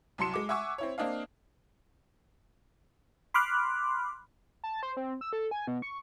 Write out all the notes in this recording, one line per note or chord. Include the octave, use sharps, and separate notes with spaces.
C2 F#3 A5 C6 C#7 E7
G#3 D6
E5 F#5 G#5 C#6 D6 E6
C4 E4 C#5
A#3 C4 D4 D#5 F5
B5 C6 D6 F6 F#6
A5
C5
C4
E6
A4
G#5
B2
C#6